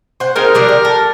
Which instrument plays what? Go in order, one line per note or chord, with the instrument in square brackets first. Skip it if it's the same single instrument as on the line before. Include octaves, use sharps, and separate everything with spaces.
[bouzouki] C5 F#5
[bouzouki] G#3 C4 D#4 [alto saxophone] A#4
[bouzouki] F3 G3 D4
G4
A4